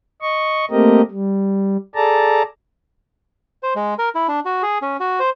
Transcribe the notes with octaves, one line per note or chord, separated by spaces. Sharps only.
D#5 C#6
A3 A#3 C4 G4 A#4 D#5
G3
G#4 A4 D5 A5 A#5
C5
G#3
A#4
E4
D4
F#4
G#4
C#4
F#4
C5